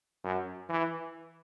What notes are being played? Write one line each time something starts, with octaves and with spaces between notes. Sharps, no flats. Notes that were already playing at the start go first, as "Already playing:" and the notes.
F#2
E3